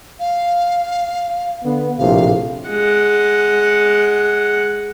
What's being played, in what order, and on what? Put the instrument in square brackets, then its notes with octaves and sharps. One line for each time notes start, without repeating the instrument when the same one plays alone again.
[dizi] F5
[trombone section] D3 B3
[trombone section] A#1 A2 C3 [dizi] F5
[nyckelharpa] G#3 F#5